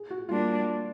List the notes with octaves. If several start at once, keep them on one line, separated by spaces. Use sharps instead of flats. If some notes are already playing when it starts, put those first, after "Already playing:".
Already playing: G#4
F#4
G3 A#3 D4 F4